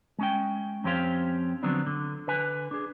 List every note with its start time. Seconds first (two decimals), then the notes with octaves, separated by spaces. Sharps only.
0.19 G#3 C#4 G5
0.84 F2 C4 C#4 G4 C5 F5
1.63 D3 F3 F#3 B3 C4 D4
1.87 D3
2.27 D3 B4 G#5
2.71 D4 G#4